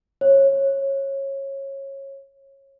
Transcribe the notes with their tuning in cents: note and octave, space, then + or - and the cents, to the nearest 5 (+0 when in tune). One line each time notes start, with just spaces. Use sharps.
C#5 -20